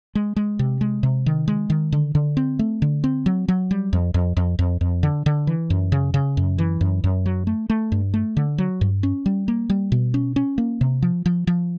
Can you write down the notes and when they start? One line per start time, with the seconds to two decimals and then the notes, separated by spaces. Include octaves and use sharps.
0.15 G#3
0.36 G#3
0.59 C3
0.81 G#3
1.03 C3
1.26 D#3
1.48 G#3
1.70 D#3
1.92 D3
2.15 D3
2.37 C4
2.59 A3
2.82 D3
3.04 C4
3.26 F#3
3.48 F#3
3.71 G3
3.93 F2
4.14 F2
4.37 F2
4.59 F2
4.81 F2
5.03 D3
5.26 D3
5.47 E3
5.70 F#2
5.92 C#3
6.14 C#3
6.37 F#2
6.58 E3
6.81 F#2
7.04 F#2
7.26 F#3
7.47 A3
7.70 A3
7.92 G2
8.14 A3
8.37 D3
8.58 F#3
8.81 G2
9.03 C#4
9.26 G3
9.48 A#3
9.70 G3
9.92 B2
10.14 C#4
10.36 C#4
10.58 A#3
10.81 C3
11.02 F3
11.26 F3
11.47 F3